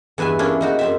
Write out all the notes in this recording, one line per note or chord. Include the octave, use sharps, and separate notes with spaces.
E2 G2 B4 E5 G#5
A#3 C#4 D4 E4 G#4
A#3 D#4 F#4
F#2 C4 E5